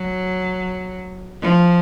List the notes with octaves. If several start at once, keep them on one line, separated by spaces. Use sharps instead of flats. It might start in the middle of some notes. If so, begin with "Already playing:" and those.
Already playing: F#3
F3